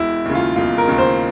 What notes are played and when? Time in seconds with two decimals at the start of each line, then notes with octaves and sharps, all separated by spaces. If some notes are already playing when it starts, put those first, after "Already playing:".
Already playing: E1 E4
0.25 D#2 C#3
0.35 F4
0.56 E1 F4
0.78 A#4
0.88 D#2 C#3
0.98 C5